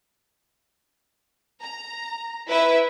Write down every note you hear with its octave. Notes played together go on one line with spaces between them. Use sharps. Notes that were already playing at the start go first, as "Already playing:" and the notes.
A#5
E4 B4 E5